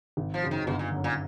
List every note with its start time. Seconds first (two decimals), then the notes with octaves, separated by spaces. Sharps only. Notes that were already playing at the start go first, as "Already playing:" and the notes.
0.17 G#1
0.34 F3
0.43 F#2 C#3 F#3
0.51 D#3
0.67 G1 B2
0.79 A#2
0.91 F#2 D3
1.04 A#2